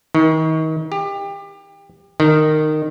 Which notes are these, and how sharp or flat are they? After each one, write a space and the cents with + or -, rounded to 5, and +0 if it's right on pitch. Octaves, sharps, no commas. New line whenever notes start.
D#3 +35
G4 +25
D#3 -15